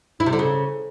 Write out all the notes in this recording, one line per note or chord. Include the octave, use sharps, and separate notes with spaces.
E4
C3
D3
C#3